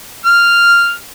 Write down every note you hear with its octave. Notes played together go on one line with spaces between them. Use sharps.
F6